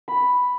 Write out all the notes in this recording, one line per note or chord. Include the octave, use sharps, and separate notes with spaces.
B5